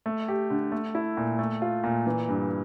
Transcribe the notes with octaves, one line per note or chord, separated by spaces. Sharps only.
A3
G4
D3
A3
E4
A#2
A3
F4
A#2
E3
G2